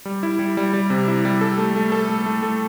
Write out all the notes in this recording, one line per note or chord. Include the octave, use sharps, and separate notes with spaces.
G3
E4
G3
G3
G3
C3
E4
G3
A4
A3
A3
A4
A3
A3
A3